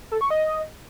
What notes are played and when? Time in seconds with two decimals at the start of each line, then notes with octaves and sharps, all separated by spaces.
0.11 A4
0.21 C#6
0.30 D#5